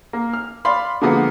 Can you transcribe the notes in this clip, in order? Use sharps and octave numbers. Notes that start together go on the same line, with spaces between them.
A#3
F6
D5 F5 B5 C6
D3 F3 G#3 A#3 B3 F#4